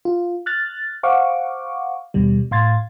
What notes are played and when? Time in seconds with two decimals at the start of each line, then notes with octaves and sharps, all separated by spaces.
0.05 F4
0.46 F6 F#6 A6
1.03 C5 F5 F#5 C#6 D6
2.14 D#2 B2 G3
2.51 A2 F5 C6 G#6 A6